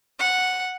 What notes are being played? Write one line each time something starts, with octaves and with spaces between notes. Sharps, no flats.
F#5